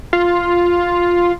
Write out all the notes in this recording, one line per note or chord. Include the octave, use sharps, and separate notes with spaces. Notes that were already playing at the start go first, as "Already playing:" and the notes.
F4